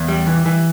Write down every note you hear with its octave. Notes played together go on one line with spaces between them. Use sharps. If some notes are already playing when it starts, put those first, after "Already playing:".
Already playing: E2
G3
E3
E3